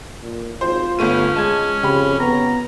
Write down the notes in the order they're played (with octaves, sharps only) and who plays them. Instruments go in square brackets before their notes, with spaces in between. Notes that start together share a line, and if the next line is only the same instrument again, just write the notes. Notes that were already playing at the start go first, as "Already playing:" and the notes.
[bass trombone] A#2
[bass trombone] G#1 [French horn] F4 [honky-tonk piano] C5
[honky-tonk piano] G1 A3 D#7 [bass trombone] B3 [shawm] C#4
[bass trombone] G#3 [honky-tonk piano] A5 G#6
[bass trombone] F2 [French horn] C#3 [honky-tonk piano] G4 B5
[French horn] B3 [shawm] A#5